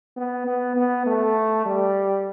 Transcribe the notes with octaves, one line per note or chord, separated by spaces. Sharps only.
B3
B3
B3
A3
G3